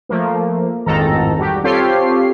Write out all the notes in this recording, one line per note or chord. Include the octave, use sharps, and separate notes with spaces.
F3 A3 A#3
A1 F2 G#2 D#3 A4 A#5
G3 F#4 G4
C4 F4 G4 A4 C#5 C7